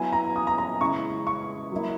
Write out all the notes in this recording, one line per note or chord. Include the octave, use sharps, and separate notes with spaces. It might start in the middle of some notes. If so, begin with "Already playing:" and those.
Already playing: F#3 B3 E4 G#5
A#5
D#6
A#5
A#5
C#3 G#3 C#4 E4 C#6
C#6
F#3 A#3 E4